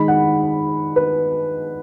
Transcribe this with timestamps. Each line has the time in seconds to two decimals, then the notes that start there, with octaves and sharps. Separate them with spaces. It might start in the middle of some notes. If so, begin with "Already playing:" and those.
Already playing: D#3 G#3 D#4 B5
0.08 F#5
0.96 B4